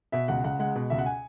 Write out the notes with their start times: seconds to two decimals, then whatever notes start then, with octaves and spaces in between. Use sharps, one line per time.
0.12 B2 E5
0.28 C#2 F#5
0.44 C#2 F#5
0.59 G#3 F#5
0.75 B2
0.90 C#2 E5
0.99 F#5
1.06 G#5